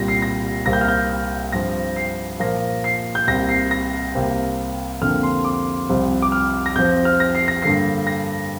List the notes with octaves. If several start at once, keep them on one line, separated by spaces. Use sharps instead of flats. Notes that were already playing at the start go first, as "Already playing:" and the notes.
Already playing: C2 A#2 G3 A#6
C7
A#6
C2 C3 A#3 A#6
G6
F6
G6
F6
G2 F3 C4 A#6
C7
A#2 F3 A#3 A#6
C7
G6
C2 C3 A#3 A#6
C7
A#6
C2 C3 A#3
F2 D3 A#3 F6
C6
D6
C2 C3 F3 C4
D6
F6
A#6
F2 F3 C4 G6
F6
A#6
C7
A#6
G2 D3 A#3 C7
A#6